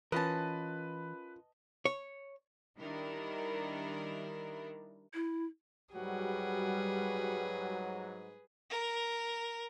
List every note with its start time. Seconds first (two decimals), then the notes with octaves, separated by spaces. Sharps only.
0.12 E3 C#4 F4 A#4 B4 D#5 A5
1.85 C#5
2.79 D#3 G3 D4 E4 A#4
5.14 E4
5.95 G#2 F#3 G3 F#4 G#4 B4
8.70 A#4